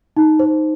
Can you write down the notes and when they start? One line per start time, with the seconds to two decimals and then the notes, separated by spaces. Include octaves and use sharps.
0.17 D#4
0.39 C5